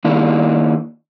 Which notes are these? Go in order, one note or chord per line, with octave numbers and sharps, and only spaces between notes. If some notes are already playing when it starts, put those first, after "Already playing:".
D#3 A#3 D4 E4